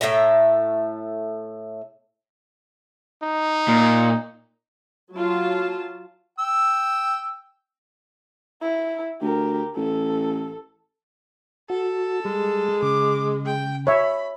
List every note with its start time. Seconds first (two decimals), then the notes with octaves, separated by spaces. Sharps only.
0.01 A2 A4 E5 A#5
3.22 D#4
3.68 A#2
5.14 F#3 F4 A5
6.39 G5 E6
8.62 E4
9.22 D2 G4 A#4
9.76 A1 A4
11.70 F#4 A4
12.25 G3 G#3
12.83 C#3 D6
13.46 G5
13.87 C#5 E5 B5